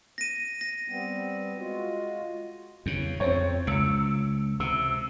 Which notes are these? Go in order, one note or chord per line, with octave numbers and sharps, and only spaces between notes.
A#6 D#7
A#6
G3 B3 C4
G#3 F4 F#4
E2 C#3
F2 C4 C5 C#5
C#2 E6 C#7 D7
C3 E6